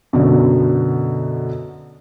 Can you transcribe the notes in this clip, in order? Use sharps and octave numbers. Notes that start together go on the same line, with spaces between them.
F#2 B2 D3